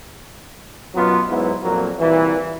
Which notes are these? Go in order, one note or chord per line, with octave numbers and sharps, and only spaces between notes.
F#2 B2 F#3 B3 F4
G#2 F#3 B3 E4
F2 A#2 F#3 A#3
C2 A#2 E3